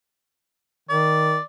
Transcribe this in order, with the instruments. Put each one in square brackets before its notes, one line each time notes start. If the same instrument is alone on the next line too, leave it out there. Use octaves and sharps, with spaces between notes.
[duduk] D#3 [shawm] D5